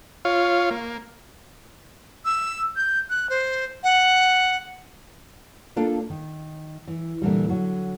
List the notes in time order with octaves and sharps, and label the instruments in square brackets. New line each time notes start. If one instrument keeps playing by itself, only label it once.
[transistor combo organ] F4 C#5 F5
A#3
[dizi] E6
G6
F#6
C5
F#5
[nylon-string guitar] A#3 D4 F4 A4
D#3
E3
A#2 D3 E3 G3
D3 F#3